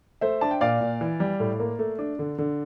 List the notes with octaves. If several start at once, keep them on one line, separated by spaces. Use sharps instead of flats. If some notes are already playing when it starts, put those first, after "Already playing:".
A3 C5 E5
D4 A5
G5
A#2 D5 F5
A#2
E3
G3
A2
A#3
A3
D4
D3
D3